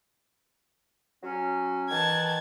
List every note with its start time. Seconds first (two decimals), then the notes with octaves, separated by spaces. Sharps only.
1.23 F#3 C#4
1.89 D#3 E3 A5 G#6